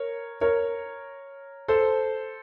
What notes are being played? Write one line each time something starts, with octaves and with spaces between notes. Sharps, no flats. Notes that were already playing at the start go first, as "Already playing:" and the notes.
Already playing: A#4 C#5
A#4 C#5
A4 C5